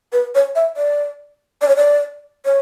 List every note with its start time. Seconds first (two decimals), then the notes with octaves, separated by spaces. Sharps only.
0.13 B4
0.35 C#5
0.55 E5
0.77 D5
1.62 D5
1.68 C#5
1.76 D5
2.45 C#5